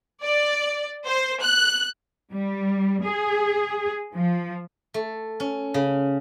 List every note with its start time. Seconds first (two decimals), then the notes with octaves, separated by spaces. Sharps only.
0.23 D5
1.06 C5
1.42 F#6
2.31 G3
3.04 G#4
4.15 F3
4.94 A3
5.40 C#4
5.74 C#3